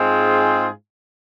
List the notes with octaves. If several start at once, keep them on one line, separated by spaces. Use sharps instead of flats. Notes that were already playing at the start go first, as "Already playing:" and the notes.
Already playing: G#2 G#3 C4 F4 G#4